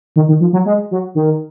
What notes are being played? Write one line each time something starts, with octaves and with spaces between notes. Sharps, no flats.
D#3
D#3
F3
F#3
G#3
F#3
D#3